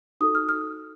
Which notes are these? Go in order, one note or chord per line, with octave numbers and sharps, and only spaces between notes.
D#4 F#4 A4 D#6
F6
F6